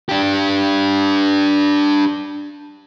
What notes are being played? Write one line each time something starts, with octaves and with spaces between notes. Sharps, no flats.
D4 G4